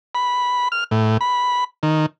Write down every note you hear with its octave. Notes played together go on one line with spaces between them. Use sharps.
B5
F6
A2
B5
D#3